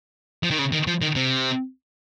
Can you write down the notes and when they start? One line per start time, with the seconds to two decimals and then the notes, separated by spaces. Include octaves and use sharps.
0.43 F3
0.51 D#3
0.59 C#3
0.72 D#3
0.87 F3
1.02 D#3
1.15 C3